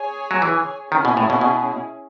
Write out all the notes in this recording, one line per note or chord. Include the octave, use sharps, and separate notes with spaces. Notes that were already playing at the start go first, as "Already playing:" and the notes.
Already playing: G#4 C#5 G#5
F#3
E3
D#3 C#4 E4 G#4
B2
A2
B2
B2